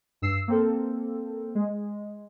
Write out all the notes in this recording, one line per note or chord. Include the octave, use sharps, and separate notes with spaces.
G2 E6 C7
A#3 C4 A4
G#3